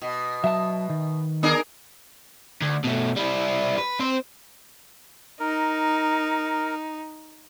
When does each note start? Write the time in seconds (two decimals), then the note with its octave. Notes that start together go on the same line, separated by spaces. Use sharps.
0.02 B2
0.44 F#3 E5 A5
0.90 D#3
1.43 B3 D4 G#4 A#4
2.61 D2
2.84 B2 A3
3.16 G3 E4
3.78 B4
4.00 C4 C5
5.40 D#4 A#4